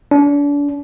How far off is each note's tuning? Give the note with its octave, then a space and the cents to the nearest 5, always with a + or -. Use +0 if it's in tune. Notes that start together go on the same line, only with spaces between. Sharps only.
D4 -35